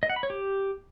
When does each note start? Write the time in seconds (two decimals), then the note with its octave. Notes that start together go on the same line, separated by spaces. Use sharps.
0.03 D#5
0.10 F#5
0.16 B5
0.23 C#5
0.30 G4